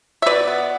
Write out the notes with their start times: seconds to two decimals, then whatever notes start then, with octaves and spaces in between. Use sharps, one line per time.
0.22 E5
0.26 B2 B4 D5
0.48 B3